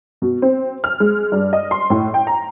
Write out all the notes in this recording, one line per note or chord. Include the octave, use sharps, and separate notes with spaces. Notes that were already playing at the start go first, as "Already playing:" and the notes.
B2
C4
F6
G#3
G2
D#5
C6
A2
G5
A#5